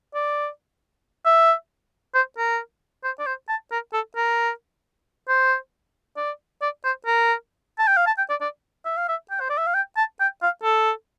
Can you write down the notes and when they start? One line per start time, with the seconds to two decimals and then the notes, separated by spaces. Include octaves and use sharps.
0.14 D5
1.26 E5
2.14 C5
2.38 A#4
3.04 C5
3.20 D5
3.27 C5
3.49 A5
3.72 A#4
3.93 A4
4.16 A#4
5.28 C5
6.17 D5
6.62 D5
6.85 C5
7.06 A#4
7.79 A5
7.88 G5
7.97 F5
8.07 A5
8.18 G5
8.30 D5
8.41 D5
8.85 E5
8.97 F5
9.09 E5
9.31 G5
9.40 C5
9.50 D5
9.58 E5
9.67 F5
9.74 G5
9.97 A5
10.20 G5
10.43 F5
10.64 A4